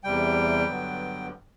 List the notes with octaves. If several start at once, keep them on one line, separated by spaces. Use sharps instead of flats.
E2 C3 G3 G5
G2 D3 F#3 B3